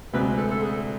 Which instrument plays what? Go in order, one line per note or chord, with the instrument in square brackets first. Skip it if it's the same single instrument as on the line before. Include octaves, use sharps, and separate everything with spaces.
[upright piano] D2 C3 G#3 [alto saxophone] B4
[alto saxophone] A4
A4
G#4